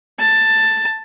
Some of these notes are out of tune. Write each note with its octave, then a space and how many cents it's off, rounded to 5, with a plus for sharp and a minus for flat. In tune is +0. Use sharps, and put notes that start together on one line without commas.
A5 +10